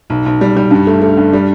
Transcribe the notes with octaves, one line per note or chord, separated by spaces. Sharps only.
B1
B1
G3
G3
G2
A3
A3
G2
G3